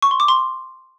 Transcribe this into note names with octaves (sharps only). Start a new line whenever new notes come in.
C#6
C6
D6
C6